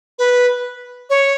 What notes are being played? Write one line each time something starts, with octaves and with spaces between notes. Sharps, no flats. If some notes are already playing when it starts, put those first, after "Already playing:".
B4
C#5